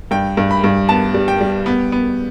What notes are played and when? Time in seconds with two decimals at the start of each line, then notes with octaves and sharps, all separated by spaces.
0.11 G2 G5
0.37 G2
0.51 B5
0.64 G2
0.89 B3 A5
1.14 G3
1.28 G5
1.41 G3
1.66 B3
1.92 B3